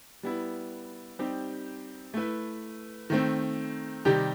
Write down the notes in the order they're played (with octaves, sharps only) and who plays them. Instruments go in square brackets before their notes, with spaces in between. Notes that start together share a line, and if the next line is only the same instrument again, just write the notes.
[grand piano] G3 B3 E4
G3 C4 D#4 G4
A3 E4 B4
D#3 A3 C4
C3 D#3 G3 D#4 G4